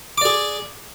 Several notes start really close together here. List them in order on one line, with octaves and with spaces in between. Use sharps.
D6 D5 G#4